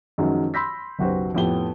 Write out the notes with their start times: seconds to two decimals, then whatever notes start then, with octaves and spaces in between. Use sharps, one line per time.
0.18 F#2 D#3 F3 F#3 G#3 C#4
0.54 B5 C6 E6 G6 A#6 B6
0.99 F#1 B1 F#4 G4 B4 C5
1.35 F2 A2 B3 G4 G5 G7